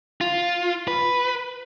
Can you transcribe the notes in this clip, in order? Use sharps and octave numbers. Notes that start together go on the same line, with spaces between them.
F4
B4